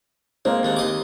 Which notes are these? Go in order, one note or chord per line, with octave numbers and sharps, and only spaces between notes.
G#3 A#3 C4
D#2 G#3 A3
D#2 D#5 D6